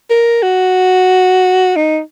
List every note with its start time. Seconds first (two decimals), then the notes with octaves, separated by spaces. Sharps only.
0.10 A#4
0.43 F#4
1.76 D#4